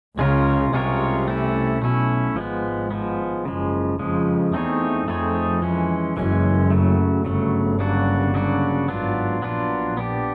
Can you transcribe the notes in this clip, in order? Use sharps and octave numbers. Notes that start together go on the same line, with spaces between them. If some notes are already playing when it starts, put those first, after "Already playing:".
C#2 C#3 G#3 C#4 F4 A#4 C#5
C2 C3 G#3 C#4 F4 A#4 C#5
A3 C#4 E4
B1 B2 A3 C#4 E4
G#1 G#2 F3 G#3 B3
F3 G#3 B3
F#1 F#2 C#3 F3 G#3
F2 C#3 F3 G#3
E2 A3 C4 D#4 G#4 C#5
F2 A3 C4 D#4 G#4 C#5
E3 G#3 C#4
F#1 F#2 E3 G#3 C#4
C#3 F#3 A3
G1 G2 C#3 F#3 A3
C#3 F#3 A#3 D4 F#4
C#3 F#3 A#3 D4 F#4
G#1 G#2 F#3 B3 D4 F4
A#1 A#2 F#3 B3 D4 F4
B3 D4 G4